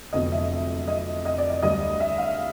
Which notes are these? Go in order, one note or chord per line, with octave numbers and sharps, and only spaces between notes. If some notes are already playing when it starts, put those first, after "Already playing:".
F1 F2 D3 F#3 B3 D#5
E5
D#5
D#5
D5
D#5
D2 D3 G3 C4 D#5
E5
F5